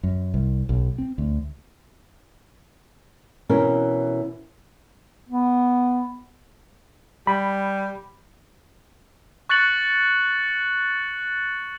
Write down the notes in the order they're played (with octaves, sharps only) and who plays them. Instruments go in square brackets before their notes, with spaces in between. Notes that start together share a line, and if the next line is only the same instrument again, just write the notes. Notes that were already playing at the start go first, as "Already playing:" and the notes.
[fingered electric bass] F#2
C2
B1
C4
D2
[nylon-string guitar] B2 E3 C4 C#4 A#4
[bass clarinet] B3
[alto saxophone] G3 [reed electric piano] B5
[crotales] C#6 F#6 A6 C#7 F#7